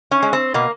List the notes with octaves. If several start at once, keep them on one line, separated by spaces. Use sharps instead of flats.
C#4
G#3
C4
B2 A#3